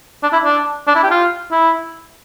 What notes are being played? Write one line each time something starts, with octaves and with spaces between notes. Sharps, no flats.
D4
E4
D4
D4
E4
G4
F4
E4